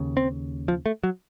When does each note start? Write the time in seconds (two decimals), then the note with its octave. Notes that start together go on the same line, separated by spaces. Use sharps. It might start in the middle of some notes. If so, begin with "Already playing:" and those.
Already playing: D#2 C#3
0.17 C4
0.68 F3
0.86 A3
1.04 F#3